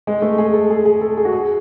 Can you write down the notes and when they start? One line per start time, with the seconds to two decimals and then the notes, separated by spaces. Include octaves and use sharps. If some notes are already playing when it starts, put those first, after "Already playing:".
0.07 G#3
0.22 A3
0.38 G#4
0.54 A4
0.70 G#4
0.85 G#4
1.01 A4
1.17 G#4
1.25 F#4
1.32 G#4